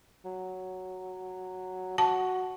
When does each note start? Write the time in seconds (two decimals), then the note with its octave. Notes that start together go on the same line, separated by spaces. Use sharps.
0.25 F#3
1.98 F#4 A5